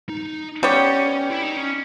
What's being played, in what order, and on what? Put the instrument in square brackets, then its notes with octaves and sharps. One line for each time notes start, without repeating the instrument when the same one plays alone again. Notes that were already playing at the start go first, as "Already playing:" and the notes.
[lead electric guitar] D#4
[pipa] G3 B3 G4 C#5 [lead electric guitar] C#4
[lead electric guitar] E4
D#4
C#4